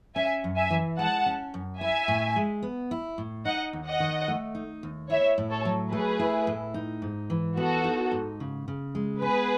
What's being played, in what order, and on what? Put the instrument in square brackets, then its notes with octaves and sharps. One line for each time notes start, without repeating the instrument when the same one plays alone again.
[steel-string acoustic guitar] C#4 [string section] E5 G#5
[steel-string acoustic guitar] F#2
[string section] E5 G#5
[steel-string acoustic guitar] E3
[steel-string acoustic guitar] G#3 [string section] F#5 A5
[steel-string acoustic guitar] C#4
F#2
[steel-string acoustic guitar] E4 [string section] E5 G#5
[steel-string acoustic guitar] A2
G#3
B3
E4
A2
[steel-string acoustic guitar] D#4 [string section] D#5 F#5
[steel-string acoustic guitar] D#2
[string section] D#5 F#5
[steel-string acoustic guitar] D#3
A3
D#4
D#2
[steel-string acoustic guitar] E4 [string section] C#5 E5
[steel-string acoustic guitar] A2
[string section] A4 C#5
[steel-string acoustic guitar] F#3
[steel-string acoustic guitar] A3 [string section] G#4 B4
[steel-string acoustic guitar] E4
A2
D#4
G#2
E3
[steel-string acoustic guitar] B3 [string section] F#4 A4
[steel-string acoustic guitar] D#4
G#2
C#3
C#3
G#3
[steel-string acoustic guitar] B3 [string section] G#4 B4